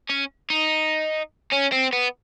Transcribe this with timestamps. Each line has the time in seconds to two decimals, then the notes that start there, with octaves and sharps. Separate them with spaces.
0.09 C#4
0.50 D#4
1.52 C#4
1.72 C4
1.93 B3